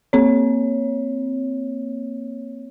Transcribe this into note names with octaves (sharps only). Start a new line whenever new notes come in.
A#3 C4 C#5